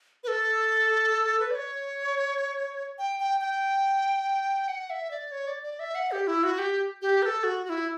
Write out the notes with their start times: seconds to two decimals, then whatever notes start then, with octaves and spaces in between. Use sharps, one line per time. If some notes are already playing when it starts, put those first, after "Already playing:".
0.24 B4
0.28 A4
1.40 B4
1.51 D5
1.55 C#5
2.98 G5
3.20 G5
3.41 G5
4.68 F#5
4.90 E5
5.11 D5
5.32 C#5
5.47 D5
5.63 D5
5.79 E5
5.95 F#5
6.11 G4
6.27 E4
6.44 F#4
6.58 G4
7.02 G4
7.22 B4
7.26 A4
7.44 F#4
7.65 F#4
7.69 E4